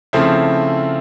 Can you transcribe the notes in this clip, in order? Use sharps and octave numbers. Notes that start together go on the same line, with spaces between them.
C#3 F3 A3 C4 E4